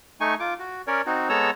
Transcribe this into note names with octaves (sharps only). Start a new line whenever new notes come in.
A3 D#4 G#5 C#6
F4 D6
F#4
C#4 A#4 C#5 D5
C4 D#4 F#4
G#3 B3 A4 C#5 A#5 E6